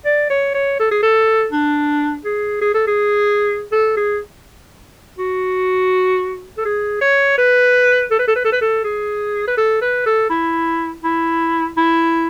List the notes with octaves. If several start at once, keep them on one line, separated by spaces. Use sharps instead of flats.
D5
C#5
C#5
A4
G#4
A4
D4
G#4
G#4
A4
G#4
A4
G#4
F#4
A4
G#4
C#5
B4
A4
B4
A4
B4
A4
B4
A4
G#4
B4
A4
B4
A4
E4
E4
E4